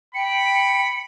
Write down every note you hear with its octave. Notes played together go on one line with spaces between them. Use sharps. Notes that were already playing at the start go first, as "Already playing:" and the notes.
G5 B5 C#7